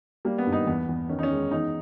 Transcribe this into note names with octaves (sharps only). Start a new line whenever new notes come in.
G3 A#3
B3
G2
D#4
E2 B3
E2
D#3 C#4
D#4
C#4
G#3
E2 D#4